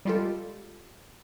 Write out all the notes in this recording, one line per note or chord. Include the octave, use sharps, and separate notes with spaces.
G3 G#3 F4 G4 A4